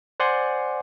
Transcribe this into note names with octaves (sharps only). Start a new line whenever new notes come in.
C5 D5 F#5 G#5 C6 F#6